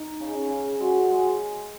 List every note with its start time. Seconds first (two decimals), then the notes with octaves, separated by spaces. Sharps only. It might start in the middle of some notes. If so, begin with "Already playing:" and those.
Already playing: D#4
0.20 C#3
0.35 C#4
0.50 C#3
0.80 G#3 F#4
1.11 G#3